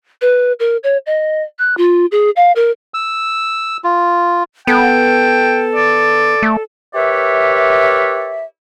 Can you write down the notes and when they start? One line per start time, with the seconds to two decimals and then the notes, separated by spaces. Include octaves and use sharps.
0.21 B4
0.60 A#4
0.84 C#5
1.06 D#5
1.59 F#6
1.77 F4
2.12 G#4
2.36 F5
2.56 A#4
2.94 E6
3.84 F4
4.67 B3 A4 G5
5.76 D5
6.43 A3
6.95 G4 A#4 B4 C#5 D5 E5